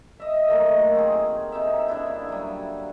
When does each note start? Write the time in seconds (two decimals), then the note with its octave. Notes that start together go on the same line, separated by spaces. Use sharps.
0.20 D#5 E5
0.48 D#3 F#3 A3 A#3
0.95 C4 G#4
1.52 C3 D#4 E5
1.88 C#3 D4 E4
2.29 F#3 G3